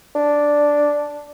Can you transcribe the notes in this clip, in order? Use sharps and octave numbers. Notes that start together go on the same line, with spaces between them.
D4